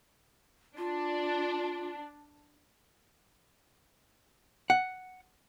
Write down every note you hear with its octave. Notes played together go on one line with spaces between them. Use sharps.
D4 F4
F#5